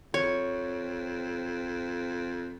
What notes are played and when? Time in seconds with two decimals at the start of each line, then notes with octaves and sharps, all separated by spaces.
0.14 F2 C#5